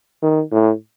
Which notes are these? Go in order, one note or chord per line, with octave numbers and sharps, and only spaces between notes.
D#3
A2